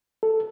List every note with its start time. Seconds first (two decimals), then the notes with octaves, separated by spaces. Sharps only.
0.23 A4